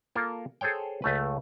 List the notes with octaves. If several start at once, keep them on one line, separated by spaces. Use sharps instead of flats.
A#3 F4 A4 A#4
G#4 A4 C5 C#5 G5
C#2 A3 B4